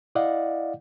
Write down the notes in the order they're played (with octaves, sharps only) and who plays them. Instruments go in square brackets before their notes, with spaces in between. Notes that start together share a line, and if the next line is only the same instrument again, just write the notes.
[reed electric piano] E4 D5 D#5 F5 F#5